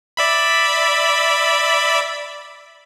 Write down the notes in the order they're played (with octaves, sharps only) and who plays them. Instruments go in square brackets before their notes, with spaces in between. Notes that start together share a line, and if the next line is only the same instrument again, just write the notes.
[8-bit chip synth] D5 E5 B5